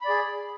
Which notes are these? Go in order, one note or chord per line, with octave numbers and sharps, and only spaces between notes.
G#4 D5 B5